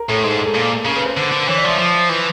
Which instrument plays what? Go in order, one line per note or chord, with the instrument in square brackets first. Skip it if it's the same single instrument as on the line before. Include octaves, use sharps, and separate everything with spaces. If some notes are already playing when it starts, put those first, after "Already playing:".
Already playing: [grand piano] A#4
[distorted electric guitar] A2 [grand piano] A4
[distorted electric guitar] G#2 [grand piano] G#4
[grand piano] A4
A4
[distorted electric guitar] A#2
[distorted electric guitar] C#3 [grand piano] A#4
[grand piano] B4
C5
[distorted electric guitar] D3
D3
[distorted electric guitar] E3 [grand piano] C#5
[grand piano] D5
[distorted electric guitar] F3 [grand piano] E5
[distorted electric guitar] F3
E3